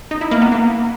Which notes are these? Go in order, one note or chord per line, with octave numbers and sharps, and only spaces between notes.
D#4
E4
A#3
B3
A#3